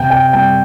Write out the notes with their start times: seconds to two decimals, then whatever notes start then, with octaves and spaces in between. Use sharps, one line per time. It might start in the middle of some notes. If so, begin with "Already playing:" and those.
Already playing: C3 G5
0.10 G5
0.33 G3 C4 G5